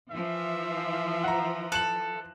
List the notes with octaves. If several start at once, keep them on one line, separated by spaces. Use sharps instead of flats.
E3 F3 E5
F#5 A#5
A4 F#6 E7 F#7